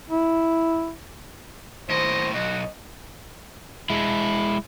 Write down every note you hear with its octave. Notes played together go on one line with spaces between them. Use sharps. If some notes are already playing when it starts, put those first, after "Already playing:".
E4
D#2 A2 C5 D#5
B1 F#4 D#5
G#3 E4